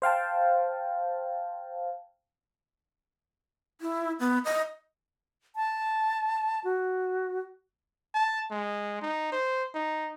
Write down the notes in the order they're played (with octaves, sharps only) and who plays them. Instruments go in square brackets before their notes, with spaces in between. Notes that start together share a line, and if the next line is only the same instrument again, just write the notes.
[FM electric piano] C5 F5 G5 A5
[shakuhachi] E4
B3
D#5
[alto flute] A5
F#4
[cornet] A5
G#3
D#4
C5
D#4